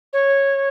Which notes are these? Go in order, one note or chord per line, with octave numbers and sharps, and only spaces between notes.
C#5